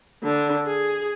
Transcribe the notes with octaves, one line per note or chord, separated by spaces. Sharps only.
D3
G#4